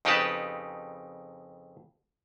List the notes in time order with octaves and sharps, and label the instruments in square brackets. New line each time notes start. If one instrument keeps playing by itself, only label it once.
[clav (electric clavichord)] F2 C#3 D#4 G4 B4 A5